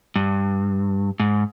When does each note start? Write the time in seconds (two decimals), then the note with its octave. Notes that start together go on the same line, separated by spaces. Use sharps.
0.16 G2
1.20 G#2